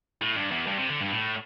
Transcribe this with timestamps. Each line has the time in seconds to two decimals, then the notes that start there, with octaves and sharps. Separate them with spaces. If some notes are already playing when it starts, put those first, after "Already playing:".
0.22 A2
0.36 G2
0.51 E2
0.67 G2
0.78 C3
0.89 D3
1.01 G2
1.12 A2